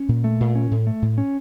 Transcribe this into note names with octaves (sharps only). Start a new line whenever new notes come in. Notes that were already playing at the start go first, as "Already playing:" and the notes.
Already playing: C#4
A#2
A3
A#2
C#4
A2
A3
A2
C#4